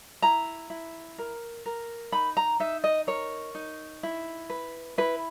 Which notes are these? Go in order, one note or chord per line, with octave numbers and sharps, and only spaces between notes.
E4 A#5
E4
A#4
A#4
D#4 B5
A#5
D#4 E5
D#5
A#4 C#5
D#4
E4
B4
E4 B4